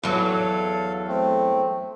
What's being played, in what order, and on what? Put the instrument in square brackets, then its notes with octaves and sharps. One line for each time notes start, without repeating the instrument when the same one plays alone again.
[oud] E2 F#3 [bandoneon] A4 F5
[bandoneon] A3 C4